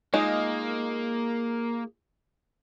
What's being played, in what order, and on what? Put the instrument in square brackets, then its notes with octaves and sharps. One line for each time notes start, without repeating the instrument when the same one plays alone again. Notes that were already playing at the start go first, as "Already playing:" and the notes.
[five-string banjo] G#3 D#4 F4 [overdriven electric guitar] A#3